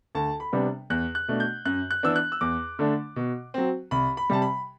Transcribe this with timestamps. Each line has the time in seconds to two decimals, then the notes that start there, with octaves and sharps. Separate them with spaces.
0.15 D2 A5
0.40 B5
0.53 C3 G3 B3 D4
0.90 E2 F#6
1.15 F#6
1.28 B2 A3 D4
1.40 G6
1.65 F#2 F#6
1.91 F#6
2.03 E3 B3 D4 E6
2.16 F#6
2.32 E6
2.41 E2 D6
2.79 D3 A3 D4
3.16 B2
3.54 F#3 C4
3.91 C2 B5
4.17 B5
4.30 C3 G3 A5
4.42 B5